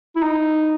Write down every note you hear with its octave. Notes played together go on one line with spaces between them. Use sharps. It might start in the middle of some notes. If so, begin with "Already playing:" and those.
E4
D#4